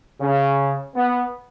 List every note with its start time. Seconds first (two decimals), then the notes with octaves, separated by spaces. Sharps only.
0.21 C#3
0.96 B3